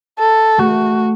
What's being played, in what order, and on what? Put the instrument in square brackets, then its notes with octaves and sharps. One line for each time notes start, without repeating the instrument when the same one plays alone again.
[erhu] A4
[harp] A3 [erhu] F#4